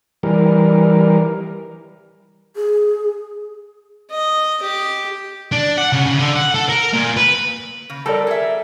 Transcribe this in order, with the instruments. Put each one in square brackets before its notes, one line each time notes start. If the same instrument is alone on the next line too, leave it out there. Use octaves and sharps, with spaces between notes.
[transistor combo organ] E3 G3 A#4
[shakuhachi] G#4
[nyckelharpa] D#5
G4
[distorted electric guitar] D4
F#5
C#3
C#3
D3
F#5
A4
A#4
A#2
B4
[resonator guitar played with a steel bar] C#3
[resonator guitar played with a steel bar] G3 C4 [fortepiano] A4 A#4 D5
[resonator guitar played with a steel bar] G#4 E5